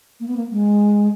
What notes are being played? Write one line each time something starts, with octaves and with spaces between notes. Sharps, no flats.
A#3
B3
A#3
G#3